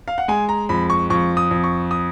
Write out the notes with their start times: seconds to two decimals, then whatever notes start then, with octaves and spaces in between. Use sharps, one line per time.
0.08 F5
0.18 F#5
0.28 G#3 G#5
0.49 A#5
0.69 F2 B5
0.90 C#6
1.10 F2 C#6
1.37 D#6
1.51 F2
1.64 C#6
1.91 D#6